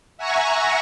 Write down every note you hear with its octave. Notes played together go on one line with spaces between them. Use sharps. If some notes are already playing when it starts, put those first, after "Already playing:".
E5 F#5 G#5 A#5 C#6